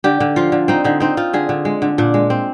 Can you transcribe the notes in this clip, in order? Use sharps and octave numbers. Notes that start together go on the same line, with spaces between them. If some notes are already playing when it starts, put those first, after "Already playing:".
D3 G4
D3
F3 F4
D3
C4 D#4
D3 D#4
C4 D#4
C4 F4
D3 G#4
D3
G#3
D3
A#2 D4
G#3
C4